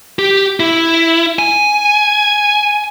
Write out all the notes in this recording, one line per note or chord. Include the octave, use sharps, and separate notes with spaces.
G4
E4
G#5